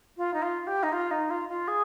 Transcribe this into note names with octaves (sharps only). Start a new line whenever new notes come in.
F4
D#4
F4
G4
D#4
F4
D#4
F4
F4
G#4